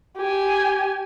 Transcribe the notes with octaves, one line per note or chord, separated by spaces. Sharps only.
G4 G#5